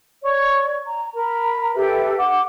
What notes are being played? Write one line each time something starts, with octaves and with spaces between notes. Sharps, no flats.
C#5 D5 C#6
A#5
A#4 A#5 B5
G4 A4 B4 E5
F#5 D6